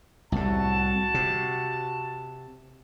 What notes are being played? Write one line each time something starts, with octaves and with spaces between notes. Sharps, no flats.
C2 A2 F#4 A5
C3